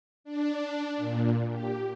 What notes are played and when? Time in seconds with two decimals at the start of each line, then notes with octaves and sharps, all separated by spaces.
0.24 D4
0.97 A#2
1.50 G4